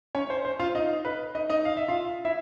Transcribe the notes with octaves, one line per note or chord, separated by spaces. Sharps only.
C#4 C#5
C5
C5
F4 F5
D#4 D#5
B4
D#4 D#5
D#4 D#5
F5
E5
F4 F5
E4 E5